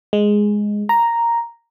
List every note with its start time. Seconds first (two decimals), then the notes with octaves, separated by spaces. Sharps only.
0.13 G#3
0.89 A#5